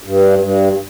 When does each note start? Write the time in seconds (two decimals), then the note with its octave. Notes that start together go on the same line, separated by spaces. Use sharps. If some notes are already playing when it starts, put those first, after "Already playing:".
0.04 G2
0.39 G2